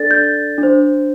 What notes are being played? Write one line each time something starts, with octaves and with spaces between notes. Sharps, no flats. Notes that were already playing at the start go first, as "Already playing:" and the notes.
Already playing: D4 A4 D5 A6
G6
D4
C5